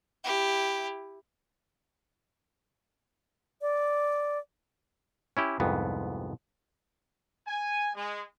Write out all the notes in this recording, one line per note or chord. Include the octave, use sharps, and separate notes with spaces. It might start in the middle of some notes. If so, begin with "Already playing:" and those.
E4 G4
D5
C#4 E4 G4
C2 F2 G#2 B3
G#5
G#3